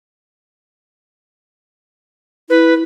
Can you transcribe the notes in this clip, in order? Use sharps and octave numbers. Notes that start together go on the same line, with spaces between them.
E4 B4